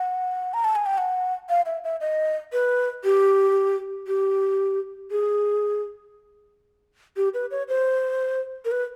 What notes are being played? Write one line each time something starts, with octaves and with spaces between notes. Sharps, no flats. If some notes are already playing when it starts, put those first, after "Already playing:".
Already playing: F#5
A#5
A5
G#5
G5
F#5
F5
E5
E5
D#5
B4
G4
G4
G#4
G4
B4
C#5
C5
A#4
B4